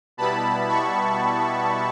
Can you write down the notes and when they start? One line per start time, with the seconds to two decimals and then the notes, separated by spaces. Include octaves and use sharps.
0.17 B2 G3 B3 E4 A5 B5
0.69 B5 C#6